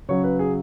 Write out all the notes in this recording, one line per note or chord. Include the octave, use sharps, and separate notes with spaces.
C#3 F#3 C#5
B4
G#4